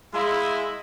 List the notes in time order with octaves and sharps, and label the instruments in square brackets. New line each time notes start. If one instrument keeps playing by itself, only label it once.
[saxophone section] G#3 [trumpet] E4 [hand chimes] F5 A#5 C6